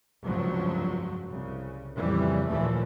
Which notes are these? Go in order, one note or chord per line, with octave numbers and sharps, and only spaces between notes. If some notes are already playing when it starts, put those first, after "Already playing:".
F1 C#2 G2 F3 F#3
C2 C#3
F2 A#2 C#3 E3 G3
D#2 A#2 E3 F3 A3